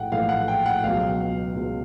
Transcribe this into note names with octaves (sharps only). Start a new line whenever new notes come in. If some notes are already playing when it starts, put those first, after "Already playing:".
Already playing: A#1 A2 E3 A3 F#5 G5
A#1 A2 E3 A3 F5
F#5
G5
F#5
C#2 B2 F#3 F5
C#2 B2 F#3